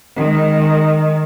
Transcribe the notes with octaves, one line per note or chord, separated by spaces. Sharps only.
D#3 G#3